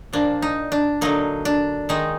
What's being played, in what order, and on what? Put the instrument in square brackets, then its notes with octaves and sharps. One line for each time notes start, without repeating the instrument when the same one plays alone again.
[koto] A#2 F3 A#3 D4
D#4
D4
D3 F#3 A#3 D#4
D4
D#3 G#3 D#4